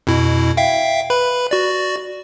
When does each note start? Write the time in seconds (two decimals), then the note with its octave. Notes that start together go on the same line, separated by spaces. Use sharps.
0.07 F2 B2 E4
0.57 E5 F5 G5
1.10 B4 B5
1.51 F#4 D5